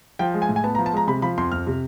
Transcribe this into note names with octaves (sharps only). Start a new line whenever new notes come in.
F3 G5
G#3
G#5
A2
G#5
B3 A5
A#5
F3
A5
G#3 A#5
C3 B5
F3 B5
F2 C6
F2 F6
C3